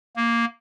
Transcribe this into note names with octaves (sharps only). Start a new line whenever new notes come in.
A#3